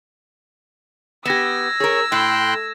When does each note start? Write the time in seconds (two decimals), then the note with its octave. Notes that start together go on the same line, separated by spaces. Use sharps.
1.25 B3 G4 E6 G#6 A#6 E7
1.80 G#4 A#4 C#5
2.12 A2 G5 C6 F#6